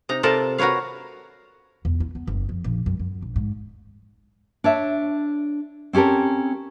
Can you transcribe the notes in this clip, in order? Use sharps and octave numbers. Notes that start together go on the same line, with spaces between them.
C3 D#4 A#5
C3 F4 A4 A#4 D5 A5
F#4 A#4 B4 C#5 F5
E2
E4
B3
F#1
F2
A#1
F#2
F#2
A#1
G#2
D4 C#5 E5
C4 C#4 G4 A4 A#4